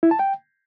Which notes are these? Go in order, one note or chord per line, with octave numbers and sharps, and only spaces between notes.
E4
A5
G5